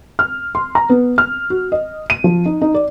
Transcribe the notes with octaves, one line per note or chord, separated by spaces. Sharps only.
F6
C6
A#5
B3
F6
F#4
D#5
D#7
F3
D#4
D#4
D5